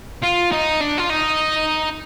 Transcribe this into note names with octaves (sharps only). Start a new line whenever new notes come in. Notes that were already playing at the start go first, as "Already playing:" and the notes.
F4
D#4
D4
F4
D#4